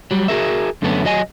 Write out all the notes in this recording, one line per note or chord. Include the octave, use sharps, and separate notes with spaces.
F#3 G3
F#4 G#4 A#4 E5
F#2 D3 A3 B3 C#4
F#3 D#5 G#5